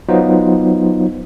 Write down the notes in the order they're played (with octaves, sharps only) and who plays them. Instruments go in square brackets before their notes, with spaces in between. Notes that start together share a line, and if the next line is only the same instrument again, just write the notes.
[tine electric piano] F#3 B3 D#4 F4 C5